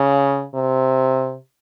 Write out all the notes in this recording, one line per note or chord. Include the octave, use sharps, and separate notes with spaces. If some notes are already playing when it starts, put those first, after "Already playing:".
Already playing: C#3
C3